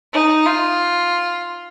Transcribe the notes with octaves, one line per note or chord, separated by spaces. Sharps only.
D#4
F4